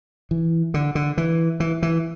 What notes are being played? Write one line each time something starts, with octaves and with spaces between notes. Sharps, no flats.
E3
D3
D3
E3
E3
E3